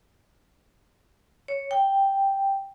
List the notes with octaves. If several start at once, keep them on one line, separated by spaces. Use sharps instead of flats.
C#5
G5